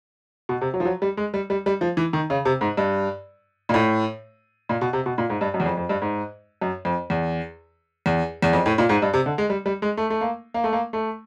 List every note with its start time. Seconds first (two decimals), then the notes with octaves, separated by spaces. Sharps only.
0.49 B2
0.61 C3
0.74 F#3
0.80 F3
0.85 F#3
1.02 G3
1.17 G#3
1.34 G3
1.50 G3
1.66 G3
1.81 F3
1.97 E3
2.13 D#3
2.30 C#3
2.45 C3
2.61 G#2
2.77 G2
3.69 A#2
3.74 A2
4.69 A#2
4.81 B2
4.93 C3
5.06 B2
5.18 A#2
5.30 G#2
5.41 G2
5.54 F#2
5.60 E2
5.66 F2
5.77 F2
5.89 G2
6.02 G#2
6.61 F#2
6.85 F2
7.10 E2
8.06 E2
8.42 E2
8.53 F2
8.66 A2
8.78 A#2
8.89 G#2
9.02 G2
9.14 C3
9.26 D3
9.38 G#3
9.50 G3
9.66 G3
9.82 G#3
9.97 A3
10.10 A3
10.21 A#3
10.54 A#3
10.64 A3
10.73 A#3
10.93 A3